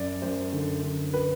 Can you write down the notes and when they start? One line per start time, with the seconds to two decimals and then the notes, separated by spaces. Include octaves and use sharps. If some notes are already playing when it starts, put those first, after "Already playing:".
Already playing: F#2 D5
0.22 F#2 C5
0.53 D3
0.83 D3
1.13 B4